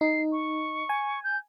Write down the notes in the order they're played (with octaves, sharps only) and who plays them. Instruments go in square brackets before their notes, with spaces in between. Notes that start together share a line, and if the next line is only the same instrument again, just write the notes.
[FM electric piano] D#4 [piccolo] C7
[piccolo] C#6
[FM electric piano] G#5
[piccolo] G6